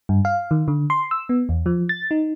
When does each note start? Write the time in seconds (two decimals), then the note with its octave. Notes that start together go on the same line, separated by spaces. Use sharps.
0.09 G2
0.25 F5
0.51 D#3
0.68 D3
0.90 C6
1.11 E6
1.29 B3
1.49 E2
1.66 F3
1.89 A6
2.11 D#4